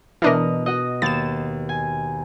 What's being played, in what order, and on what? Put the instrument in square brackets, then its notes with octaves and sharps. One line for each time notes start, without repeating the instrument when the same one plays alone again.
[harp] B2 D#5 F6 [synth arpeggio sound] E3 D4 A#4
[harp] F#4 D#5
[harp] D#2 [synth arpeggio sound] A6 E7
[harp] G#5